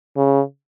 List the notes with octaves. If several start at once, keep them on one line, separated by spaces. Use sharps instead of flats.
C#3